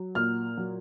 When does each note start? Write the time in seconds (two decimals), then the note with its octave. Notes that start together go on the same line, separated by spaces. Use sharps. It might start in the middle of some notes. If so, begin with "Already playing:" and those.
Already playing: F#3
0.15 A#2 F6
0.57 F#3